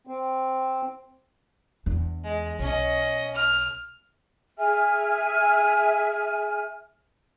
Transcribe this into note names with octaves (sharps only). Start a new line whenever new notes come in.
C4
E2 D4
G#3
B1 C#4 D#5
F6
G#4 E5 G#5 F6